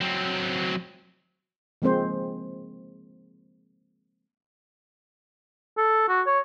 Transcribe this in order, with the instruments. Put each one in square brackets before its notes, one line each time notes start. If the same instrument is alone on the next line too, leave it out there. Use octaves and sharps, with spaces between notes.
[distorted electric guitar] F#3 C4
[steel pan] F3 G#3 A#3 C4 C5
[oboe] A4
F#4
C#5